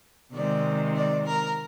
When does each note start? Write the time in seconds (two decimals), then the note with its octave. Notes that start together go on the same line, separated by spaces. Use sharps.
0.33 C3 D#3 G#3 C4 D5
0.96 D5
1.27 A#4